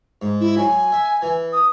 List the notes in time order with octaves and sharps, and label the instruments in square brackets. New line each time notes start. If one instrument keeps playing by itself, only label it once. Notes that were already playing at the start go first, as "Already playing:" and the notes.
[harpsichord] G#2
[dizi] E4
[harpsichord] F#3 [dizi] G#5
[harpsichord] E5
E3
[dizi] D#6